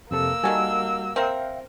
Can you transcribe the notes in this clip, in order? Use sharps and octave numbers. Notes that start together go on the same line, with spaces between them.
F2 C3 A#3 A4 E6
D#3 G3 F#4 A4 F#5 G#5
C4 A#4 E5 F5 G5